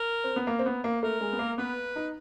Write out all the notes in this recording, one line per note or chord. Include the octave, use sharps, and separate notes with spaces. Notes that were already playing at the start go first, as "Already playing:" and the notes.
Already playing: A#4
C4
B3
A#3
C4
B3
A#3
A3 A#4
G#3
B3
A#3
B3 B4
D#4